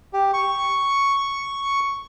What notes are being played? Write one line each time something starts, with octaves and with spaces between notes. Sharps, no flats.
G4
C#6